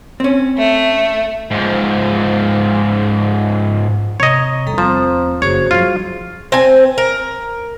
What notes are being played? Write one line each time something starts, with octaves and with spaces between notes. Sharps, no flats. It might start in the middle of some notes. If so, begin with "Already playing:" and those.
C4 C#4
A3
G#2 F3
C3 C#5 D#5 A#5
E2 G3 A3 A4 A#5
F3 C4 C5 A#5
F#1 F2 F#4 G#4 C5 C#5
F3 G3 F4
C4 G#5
A#4